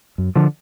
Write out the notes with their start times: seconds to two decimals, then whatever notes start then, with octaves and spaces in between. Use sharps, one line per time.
0.18 F#2
0.35 D3 F3